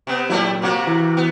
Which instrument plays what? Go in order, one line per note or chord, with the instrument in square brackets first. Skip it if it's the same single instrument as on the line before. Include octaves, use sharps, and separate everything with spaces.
[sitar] C3 B3
[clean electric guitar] A#2 F#3 [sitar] G3 A3 E4
[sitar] C3 A#3 F#4
[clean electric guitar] E3
[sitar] B3